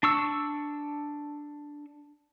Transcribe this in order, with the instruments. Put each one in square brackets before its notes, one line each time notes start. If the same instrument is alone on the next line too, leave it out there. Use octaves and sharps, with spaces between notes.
[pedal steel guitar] D4 C#6 E6